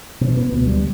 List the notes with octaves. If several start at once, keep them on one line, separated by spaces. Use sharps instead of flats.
B2
B3
D2
G3